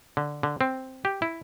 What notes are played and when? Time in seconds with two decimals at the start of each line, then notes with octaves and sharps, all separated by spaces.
0.17 D3
0.43 D3
0.61 C4
1.05 G4
1.22 E4